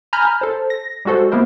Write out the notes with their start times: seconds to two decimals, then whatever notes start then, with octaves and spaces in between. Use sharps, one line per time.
0.13 G#5 A#5 B5 F6 G6
0.41 A4 C5
0.70 A#6
1.05 G3 G#3 F#4 A4 C5
1.32 A#3 B3 E4 A#4 C5